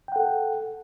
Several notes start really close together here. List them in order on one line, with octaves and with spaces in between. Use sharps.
G5 F#5 A4